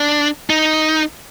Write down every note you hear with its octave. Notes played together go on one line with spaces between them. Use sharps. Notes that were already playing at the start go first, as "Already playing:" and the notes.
Already playing: D4
D#4